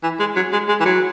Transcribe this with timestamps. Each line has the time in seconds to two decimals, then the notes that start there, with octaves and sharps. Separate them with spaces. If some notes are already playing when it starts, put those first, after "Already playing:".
0.03 E3
0.20 G#3
0.36 F#3
0.53 G#3
0.69 G#3
0.80 E3
0.85 F#3